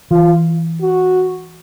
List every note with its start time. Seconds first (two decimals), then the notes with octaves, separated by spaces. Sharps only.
0.11 E3 F4
0.82 F#4